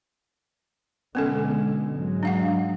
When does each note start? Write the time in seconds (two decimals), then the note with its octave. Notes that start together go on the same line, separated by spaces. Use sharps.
1.15 B2 D3 G#3 B3 C#4 A4
1.90 G#2 F#3 G#3
2.23 D4 F5 F#5